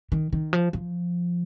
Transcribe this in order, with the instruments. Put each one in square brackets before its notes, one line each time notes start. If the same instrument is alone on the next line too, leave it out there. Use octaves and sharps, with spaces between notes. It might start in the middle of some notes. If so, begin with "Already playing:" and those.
[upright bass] D#3
D#3
F3
F3